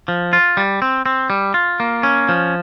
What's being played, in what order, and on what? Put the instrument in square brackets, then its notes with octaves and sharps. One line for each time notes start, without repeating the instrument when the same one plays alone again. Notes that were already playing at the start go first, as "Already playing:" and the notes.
[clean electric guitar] F3
F4
G3
C4
C4
G3
F4
A#3
C#4
F3